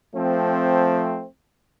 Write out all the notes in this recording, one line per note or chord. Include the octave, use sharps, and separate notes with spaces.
F3 A3 C4